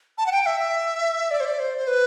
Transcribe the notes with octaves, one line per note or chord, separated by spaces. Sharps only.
A5
F#5
G5
E5
E5
D5
C5
D5
C5
C5
B4